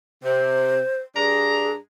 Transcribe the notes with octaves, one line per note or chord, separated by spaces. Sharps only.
C3 C5
G2 D4 G#4 A#5